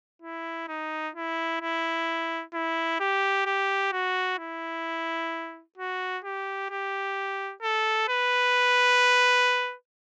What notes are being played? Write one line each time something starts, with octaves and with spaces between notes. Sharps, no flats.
E4
D#4
E4
E4
E4
G4
G4
F#4
E4
F#4
G4
G4
A4
B4